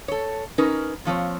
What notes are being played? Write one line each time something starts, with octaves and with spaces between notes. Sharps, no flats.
A4 C#5
C#4 D#4 A#4 B4
A#2 F3 C4 C#5